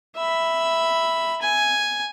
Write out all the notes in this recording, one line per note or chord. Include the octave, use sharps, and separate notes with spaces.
E5 B5
G#5